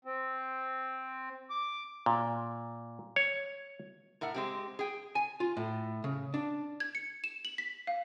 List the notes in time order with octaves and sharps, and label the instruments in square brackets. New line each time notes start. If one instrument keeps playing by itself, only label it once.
[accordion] C4
D6
[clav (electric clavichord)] A#2
C#5
[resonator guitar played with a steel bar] A2 A#4 E5 F#5
G#3 C4 G4
G#4 G5
[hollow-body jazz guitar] G#5
F4
A2
C#3
D4
[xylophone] G#6
C#7
E7
F#7
B6
F5